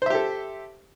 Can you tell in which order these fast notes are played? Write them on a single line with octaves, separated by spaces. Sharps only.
C5 E5 G4 A4